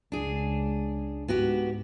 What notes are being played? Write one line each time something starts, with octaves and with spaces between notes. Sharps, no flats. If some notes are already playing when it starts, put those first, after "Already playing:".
C#2 D4 G#4
G#2 B3 F#4 G4